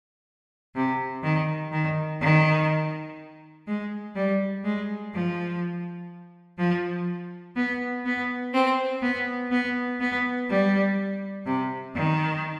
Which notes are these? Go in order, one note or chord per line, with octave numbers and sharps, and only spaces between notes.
C3
D#3
D#3
D#3
G#3
G3
G#3
F3
F3
B3
B3
C4
B3
B3
B3
G3
C3
D#3